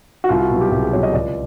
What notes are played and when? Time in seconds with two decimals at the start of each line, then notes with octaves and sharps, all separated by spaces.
0.24 F#4
0.29 C2 F4
0.40 F#4
0.50 B2
0.55 F#3
0.61 G4
0.71 C2 G4
0.82 G#4
0.92 B2 F#3 C#5
1.03 D#5
1.13 C#2 D5